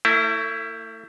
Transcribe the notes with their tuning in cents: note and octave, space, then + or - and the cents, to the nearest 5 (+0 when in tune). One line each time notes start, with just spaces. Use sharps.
A3 +35 E4 +0